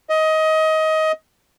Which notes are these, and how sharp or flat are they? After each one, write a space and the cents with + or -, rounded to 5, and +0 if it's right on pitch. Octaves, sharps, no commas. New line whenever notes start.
D#5 +20